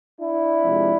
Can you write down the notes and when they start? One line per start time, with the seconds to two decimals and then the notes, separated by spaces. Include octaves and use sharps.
0.20 D4 E4
0.62 C3 F3 G#3 C4